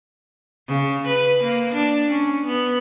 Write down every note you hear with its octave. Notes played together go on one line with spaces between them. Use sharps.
C#3
B4
A#3
D4
C#4
B3